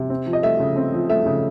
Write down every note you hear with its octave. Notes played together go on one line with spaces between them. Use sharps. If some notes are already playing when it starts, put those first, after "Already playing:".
Already playing: C3
C4
F3
D#5
A3 E5
C#3
C4
F3
A3 E5
C#3